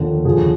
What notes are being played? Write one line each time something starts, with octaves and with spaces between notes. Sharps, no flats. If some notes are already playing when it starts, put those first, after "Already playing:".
Already playing: D#2 D3 F3
D#2 D3 F3 G#4